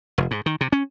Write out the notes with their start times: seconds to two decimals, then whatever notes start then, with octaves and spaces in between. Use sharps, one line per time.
0.18 F1
0.31 G#2
0.46 D#3
0.61 C3
0.72 C#4